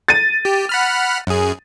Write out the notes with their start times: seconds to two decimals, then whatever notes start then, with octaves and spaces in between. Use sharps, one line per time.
0.08 A6 D#7
0.45 G4
0.69 F#5 B5 F6
1.27 F#2 G#4